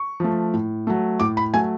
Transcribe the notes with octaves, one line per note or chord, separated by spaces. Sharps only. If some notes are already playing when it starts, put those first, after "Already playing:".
Already playing: C#6
F3 A3
A2
F#3 A3
A2 D6
B5
F#3 A3 G#5